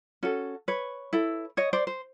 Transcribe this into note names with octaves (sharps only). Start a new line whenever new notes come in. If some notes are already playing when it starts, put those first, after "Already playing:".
C#4 F#4 A4
B4 C#5
E4 A4
C#5 D#5
C5 D5
C5